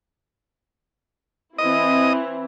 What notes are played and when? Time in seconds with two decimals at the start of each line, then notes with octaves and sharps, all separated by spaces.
1.58 E3 C4 E4 D#5